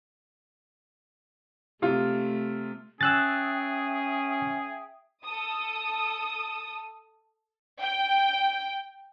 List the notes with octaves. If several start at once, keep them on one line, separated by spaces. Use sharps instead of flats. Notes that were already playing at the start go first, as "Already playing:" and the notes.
C3 A3 F4
C#4 G#4 E5 G5 D#6 E6 F#6 A6
A4 D#6
G5